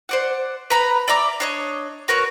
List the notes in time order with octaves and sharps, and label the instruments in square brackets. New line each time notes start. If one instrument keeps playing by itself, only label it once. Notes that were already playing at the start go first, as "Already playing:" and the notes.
[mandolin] C5 D5 F#5
B4 A#5 B5
D5 E5 A#5 D6
D4 C#5 D#5
F#4 A#4 B4 C#5